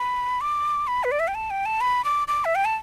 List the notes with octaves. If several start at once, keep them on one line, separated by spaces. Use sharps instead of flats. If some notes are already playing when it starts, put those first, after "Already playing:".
Already playing: B5
D6
B5
B4
D5
E5
G5
A5
G5
A5
B5
D6
D6
E5
G5
A5